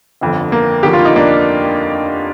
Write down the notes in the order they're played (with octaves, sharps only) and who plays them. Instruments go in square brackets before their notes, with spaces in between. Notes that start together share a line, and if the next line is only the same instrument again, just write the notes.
[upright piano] G1 F2 D3
A#3
F1 D#2 D3 F3 G4
F4
D#4
A#3 D4